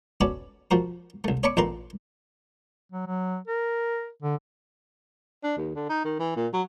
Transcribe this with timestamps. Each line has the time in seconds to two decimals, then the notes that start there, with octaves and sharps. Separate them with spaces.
0.21 C#4 F#4 A4 B4 C#5 D5
0.71 F3 F#4 A#4
1.24 C2 A3
1.43 C#5 D5 A5 B5 C#6 D6
1.57 A1 A#2 A3 B4 A#5 C6
2.92 F#3
3.07 F#3
3.48 A#4
4.22 D3
5.44 D4
5.58 D#2
5.76 D3
5.89 D#4
6.05 D#3
6.20 E3
6.37 A#2
6.53 F#3